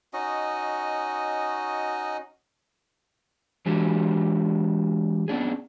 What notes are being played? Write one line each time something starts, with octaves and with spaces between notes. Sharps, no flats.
C#4 D#4 F#4 D#5
E3 G#3 D4 F#4 G4
B3 C#4 D4 G#4